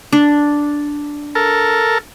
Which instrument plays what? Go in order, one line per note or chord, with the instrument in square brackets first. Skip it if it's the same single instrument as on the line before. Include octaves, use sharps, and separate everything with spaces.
[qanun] D4
[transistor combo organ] A4 A#4